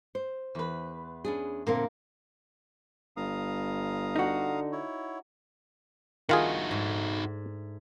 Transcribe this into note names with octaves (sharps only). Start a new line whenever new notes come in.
C5
E2 B4
C#4 D4 G#4
A#2 D3 A#3 C4
G1 F5 A#5 D#6
D3 D#4 F#4
E4 C#5
D#3 A3 D4 D#4 F4 F#4 G#4
G#2